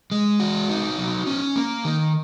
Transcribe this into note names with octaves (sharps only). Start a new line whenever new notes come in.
G#3
F#4
D#4
F#3
C#4
A#3
D#3